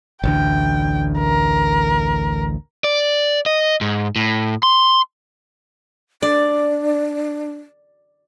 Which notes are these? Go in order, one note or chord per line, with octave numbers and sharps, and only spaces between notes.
A1 D2 D3 G5
A#4
D5
D#5
G#2
A2
C6
D4 D5